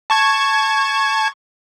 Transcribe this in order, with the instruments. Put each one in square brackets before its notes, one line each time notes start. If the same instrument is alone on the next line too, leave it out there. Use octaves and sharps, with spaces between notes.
[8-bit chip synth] A5 C#6 G#6